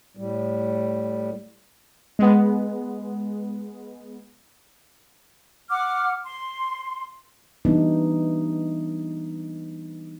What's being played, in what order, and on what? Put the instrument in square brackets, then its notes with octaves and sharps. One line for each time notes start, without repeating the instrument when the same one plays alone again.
[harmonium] A2 G3
[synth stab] G#3 B3
[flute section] F#5 D6 F6
C6
[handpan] E3 G3 B3 D4 D#4